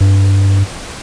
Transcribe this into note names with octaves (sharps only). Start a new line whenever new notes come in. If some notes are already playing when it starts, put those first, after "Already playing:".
G2